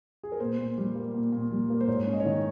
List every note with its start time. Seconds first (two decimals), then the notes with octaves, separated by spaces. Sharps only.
0.23 G#4
0.32 A#4
0.40 A#2 C5
0.59 A#2
0.78 G3
0.95 A#3
1.15 A#2
1.32 A#2
1.51 G3
1.70 A#3
1.81 C5
1.87 G#2 C#5
2.07 C#4
2.13 D#5
2.20 C#5
2.25 D#3 D#5